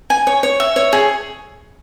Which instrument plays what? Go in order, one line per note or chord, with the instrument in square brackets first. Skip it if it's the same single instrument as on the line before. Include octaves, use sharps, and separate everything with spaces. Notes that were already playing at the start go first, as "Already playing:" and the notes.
[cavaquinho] G#5
C#5
C#5
E5
C#5
G#4